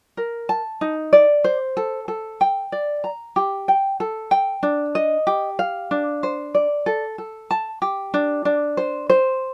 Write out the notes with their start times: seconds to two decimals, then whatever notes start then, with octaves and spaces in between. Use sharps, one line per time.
0.17 A#4
0.49 A5
0.81 D#4
1.13 D5
1.44 C5
1.77 A4
2.08 A4
2.41 G5
2.72 D5
3.04 A#5
3.36 G4
3.68 G5
4.00 A4
4.31 G5
4.63 D4
4.95 D#5
5.27 G4
5.59 F5
5.91 D4
6.23 C5
6.55 D5
6.86 A4
7.18 A4
7.51 A5
7.82 G4
8.14 D4
8.45 D4
8.77 C5
9.10 C5